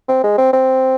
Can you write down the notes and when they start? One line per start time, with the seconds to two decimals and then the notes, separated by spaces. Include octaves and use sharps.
0.08 C4
0.23 G#3
0.38 C4
0.53 C4